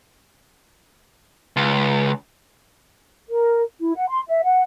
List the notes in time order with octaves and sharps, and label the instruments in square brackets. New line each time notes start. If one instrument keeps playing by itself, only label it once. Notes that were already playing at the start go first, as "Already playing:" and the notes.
[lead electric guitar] C#2
[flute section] A#4
E4
F#5
C6
E5
F#5